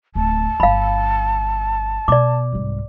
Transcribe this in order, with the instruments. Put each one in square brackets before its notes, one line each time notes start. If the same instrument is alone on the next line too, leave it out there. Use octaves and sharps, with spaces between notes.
[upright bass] D1 [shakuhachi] A5
[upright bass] G1 D#4 [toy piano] F5 B5
[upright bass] B2 [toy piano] D5 D6
[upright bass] C2 G#2